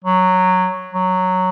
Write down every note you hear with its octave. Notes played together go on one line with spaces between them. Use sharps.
F#3
F#3